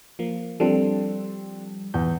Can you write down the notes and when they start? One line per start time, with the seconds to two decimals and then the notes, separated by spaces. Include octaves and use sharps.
0.19 F3 A#3
0.60 F3 G3 C4 D4 A4
1.94 E2 G6